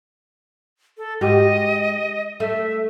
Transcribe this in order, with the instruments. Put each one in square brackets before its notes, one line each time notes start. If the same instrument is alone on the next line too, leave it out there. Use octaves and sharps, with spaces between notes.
[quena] A4
[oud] G#2 F#4 G4 [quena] D#5
[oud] A3 [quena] E5